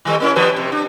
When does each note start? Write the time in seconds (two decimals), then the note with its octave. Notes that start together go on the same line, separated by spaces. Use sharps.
0.05 D#3 G3 A3
0.20 A#3 C#4 E4
0.36 E3 G3 B4
0.56 C3
0.72 D4